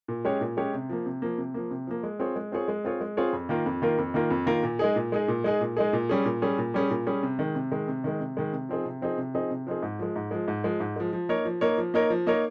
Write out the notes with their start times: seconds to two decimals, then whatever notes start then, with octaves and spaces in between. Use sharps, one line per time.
0.08 A#2
0.25 G#3 C#4 G4 C#5
0.41 A#2
0.57 G#3 C#4 G4 C#5
0.74 C3
0.89 F3 A#3
1.06 C3
1.22 F3 A#3
1.38 C3
1.54 F3 A#3
1.71 C3
1.87 F3 A#3
2.03 G#3
2.20 C4 F4 G#4 C#5
2.36 G#3
2.52 C4 F4 G#4 C#5
2.68 G#3
2.84 C4 F4 G#4 C#5
3.01 G#3
3.17 C4 F4 G#4 C#5
3.33 F2
3.49 D#3 A#3 F4 A#4
3.66 F2
3.82 D#3 A#3 F4 A#4
3.98 F2
4.14 D#3 A#3 F4 A#4
4.31 F2
4.46 D#3 A#3 F4 A#4
4.63 A#2
4.79 G#3 D#4 G#4
4.96 A#2
5.12 G#3 D#4 G#4
5.28 A#2
5.44 G#3 D#4 G#4
5.61 A#2
5.77 G#3 D#4 G#4
5.93 A#2
6.09 G3 C#4 G#4
6.26 A#2
6.42 G3 C#4 G#4
6.58 A#2
6.74 G3 C#4 G#4
6.91 A#2
7.07 G3 C#4 G#4
7.23 C3
7.39 D#3 G#3
7.55 C3
7.71 D#3 G#3
7.88 C3
8.04 D#3 G#3
8.20 C3
8.37 D#3 G#3
8.53 C3
8.69 F3 C4 D#4 G#4
8.85 C3
9.01 F3 C4 D#4 G#4
9.18 C3
9.34 F3 C4 D#4 G#4
9.50 C3
9.67 F3 C4 D#4 G#4
9.82 G#2
9.99 F3 G#3
10.16 G#2
10.31 F3 G#3
10.48 G#2
10.64 F3 G#3
10.80 G#2
10.96 F3 G#3
11.13 F3
11.29 A#3 D#4 A#4 C#5
11.45 F3
11.61 A#3 D#4 A#4 C#5
11.78 F3
11.94 A#3 D#4 A#4 C#5
12.10 F3
12.27 A#3 D#4 A#4 C#5